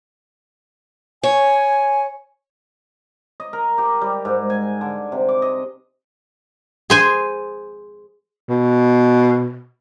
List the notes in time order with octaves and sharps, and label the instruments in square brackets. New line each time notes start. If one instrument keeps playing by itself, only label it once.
[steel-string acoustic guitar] C#5 [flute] G#5
[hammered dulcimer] D#5
A#4
G4
G3
G#2
G#5
D3
C3
D6
D#5
[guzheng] G#4 C5 G#5
[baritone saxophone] B2